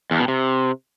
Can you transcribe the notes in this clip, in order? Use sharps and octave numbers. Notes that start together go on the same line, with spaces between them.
E2
B2
C3